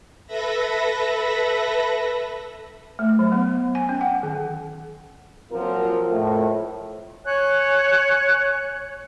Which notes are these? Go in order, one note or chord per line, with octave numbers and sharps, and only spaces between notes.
A4 B4 E5 B5 A#6
A3
F#3
B3
G#5
C#4
F#5
D#3
A#2 F3 F#3 C4 F4 A#4
F2 A2 A3
C#5 G#5 F#6